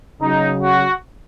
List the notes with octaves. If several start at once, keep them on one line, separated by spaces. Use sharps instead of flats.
C#3 F#3 D#4
F#4